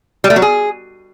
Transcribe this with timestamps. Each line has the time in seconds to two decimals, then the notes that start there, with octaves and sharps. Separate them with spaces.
0.24 G3
0.30 A3
0.36 F#3
0.42 G#4